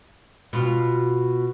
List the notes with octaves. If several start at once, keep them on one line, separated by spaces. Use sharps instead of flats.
B2 F4